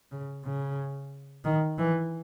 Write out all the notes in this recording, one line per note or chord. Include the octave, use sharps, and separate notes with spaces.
C#3
C#3
D#3
E3